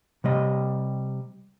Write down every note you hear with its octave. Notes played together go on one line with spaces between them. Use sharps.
C3 G3 D#5